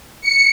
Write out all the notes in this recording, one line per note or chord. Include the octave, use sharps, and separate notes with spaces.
C#7